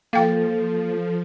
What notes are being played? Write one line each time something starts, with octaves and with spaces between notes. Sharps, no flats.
F3 A#3 A4 F5 G5